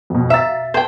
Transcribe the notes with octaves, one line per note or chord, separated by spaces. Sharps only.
F2 B2
E5 F5 A#5 A6
B4 C5 E5 G5 A5